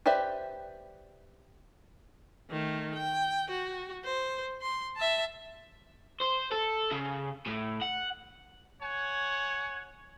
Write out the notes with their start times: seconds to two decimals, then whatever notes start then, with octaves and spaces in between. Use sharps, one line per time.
0.06 G4 B4 C5 D5 E5
2.51 D#3 A3
2.95 G5
3.50 F#4
4.05 C5
4.62 C6
4.97 E5 A5
6.21 C5
6.52 A4
6.92 C#3
7.47 A2
7.82 F#5
8.82 C#5 F#5 G#5